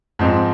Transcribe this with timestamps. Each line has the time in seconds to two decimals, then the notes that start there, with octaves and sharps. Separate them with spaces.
0.19 G#2 F3 C4 D#4